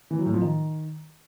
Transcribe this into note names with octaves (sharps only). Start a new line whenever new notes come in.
E3
F#3
A2
F3
D#3